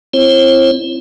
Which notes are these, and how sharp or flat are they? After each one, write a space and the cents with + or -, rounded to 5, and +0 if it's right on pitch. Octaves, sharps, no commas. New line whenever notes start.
C4 +0 E4 +30 C5 +45